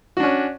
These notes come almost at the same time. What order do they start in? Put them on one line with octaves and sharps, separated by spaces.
F#4 D4 C#4